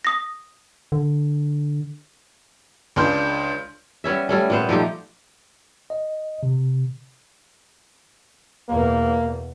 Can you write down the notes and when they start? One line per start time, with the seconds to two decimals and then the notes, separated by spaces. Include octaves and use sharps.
0.05 D#6 A#6
0.92 D3
2.96 C#2 C#3 D4 C6 F6 G6
4.04 G3 B3 C#4 E5
4.29 G3 A3 C#4
4.50 A#2 B3 C5
4.69 F3 A3 D#4 G4
5.90 D#5
6.43 C3
8.69 E2 B2 A#3